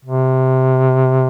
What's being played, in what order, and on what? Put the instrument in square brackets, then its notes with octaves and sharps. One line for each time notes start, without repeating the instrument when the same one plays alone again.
[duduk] C3